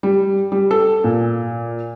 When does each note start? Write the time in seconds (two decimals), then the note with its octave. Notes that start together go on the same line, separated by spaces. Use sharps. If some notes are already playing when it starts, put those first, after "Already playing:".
0.03 G3
0.52 G3
0.71 A4
1.04 A#2